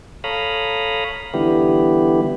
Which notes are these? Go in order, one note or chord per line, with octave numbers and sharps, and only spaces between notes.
A4 C#5 F5 A#5 B5 D#6
D3 E3 G3 B3 E4 G4